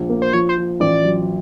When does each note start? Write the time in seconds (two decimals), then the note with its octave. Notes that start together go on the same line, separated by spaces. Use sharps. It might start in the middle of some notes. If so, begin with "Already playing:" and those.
Already playing: A#1
0.09 A#3
0.22 C5
0.33 F3 C#5
0.49 C5
0.58 F3
0.80 A1 D5
1.04 F#3